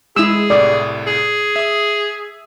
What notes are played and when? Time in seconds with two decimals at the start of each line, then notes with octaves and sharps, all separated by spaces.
0.16 G#3 E4 G#4 E6
0.50 C2 A2 D5
1.07 G#4
1.56 E5 D#6